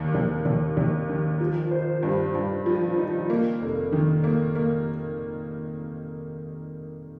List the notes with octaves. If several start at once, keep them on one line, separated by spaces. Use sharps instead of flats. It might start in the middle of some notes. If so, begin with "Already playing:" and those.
Already playing: D#2 D#3
D#2
D#2
D#2
D#3
F3
C5
G2
G2
F3
D#4
A#3
F1
D#3
A#3
A#3